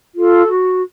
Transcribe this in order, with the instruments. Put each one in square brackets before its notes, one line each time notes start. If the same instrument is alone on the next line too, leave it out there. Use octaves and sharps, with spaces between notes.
[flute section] F4 A4
F#4